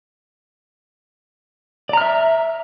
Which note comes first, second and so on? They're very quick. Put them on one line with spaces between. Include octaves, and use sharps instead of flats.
D5 A#5 F6 E5